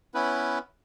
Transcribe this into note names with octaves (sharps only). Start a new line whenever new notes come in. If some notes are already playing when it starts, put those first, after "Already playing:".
B3 C#4 E4 B4